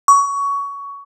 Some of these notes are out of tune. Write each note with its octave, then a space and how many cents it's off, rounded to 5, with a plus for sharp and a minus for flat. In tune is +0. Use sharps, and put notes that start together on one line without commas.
C#6 +20